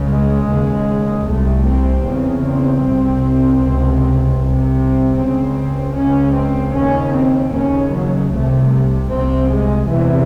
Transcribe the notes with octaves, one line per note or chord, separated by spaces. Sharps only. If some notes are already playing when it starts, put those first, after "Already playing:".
Already playing: C#2 C#3
G#3
D#2 C#3
C2 C3 A3
C4
E2 C#3
C4
C2 C3
C#2 C3
C2 C3
C4
C#2 C#3 C4
C#2 C#3 C#4
C4
D#2 C#3 C#4
C4
D#2 C#3 C#4
F#3
C2 C3 A3
C2 C3 C4
G#3
E2 C3 E3